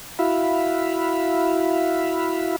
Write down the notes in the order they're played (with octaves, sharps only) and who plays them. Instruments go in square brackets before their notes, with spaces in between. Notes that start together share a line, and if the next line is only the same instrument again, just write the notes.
[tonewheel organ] E4 F#4 E5 F5 B5